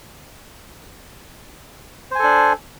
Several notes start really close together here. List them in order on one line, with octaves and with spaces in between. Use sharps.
C5 G#5 A4 D4